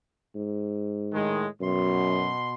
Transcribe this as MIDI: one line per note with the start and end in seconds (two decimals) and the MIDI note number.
0.35 1.26 44
1.13 1.45 45
1.13 1.45 51
1.13 1.45 56
1.61 2.30 42
1.61 2.54 47
1.61 2.54 84